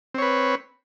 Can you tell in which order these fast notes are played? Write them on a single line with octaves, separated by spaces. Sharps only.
C4 C#5 B4